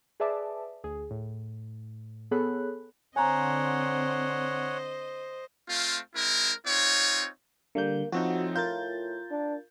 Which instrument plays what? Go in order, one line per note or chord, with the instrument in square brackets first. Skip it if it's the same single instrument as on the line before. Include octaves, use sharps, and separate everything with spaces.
[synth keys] G#4 B4 D5 E5 A5 D6
D2 G#4
A2
B3 G#4 A4 C#5 B5 F#6
[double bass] D3 C4 [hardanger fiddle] C5 D#5 [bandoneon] C#5 F#5 [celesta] G#5 A#5
[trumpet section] A3 C4 F4
G#3 C4 E4 A#4
C4 D#4 F4 C#5
[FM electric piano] D3 G3 G6 [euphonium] A#3
[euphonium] A2 [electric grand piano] F3 C4 D#4 [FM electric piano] F#4
[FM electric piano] F4 A#4 A6 [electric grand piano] G6
[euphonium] D4